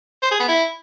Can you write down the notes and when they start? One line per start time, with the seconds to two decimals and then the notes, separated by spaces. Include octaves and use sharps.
0.23 C5
0.31 G#4
0.40 B3
0.48 E4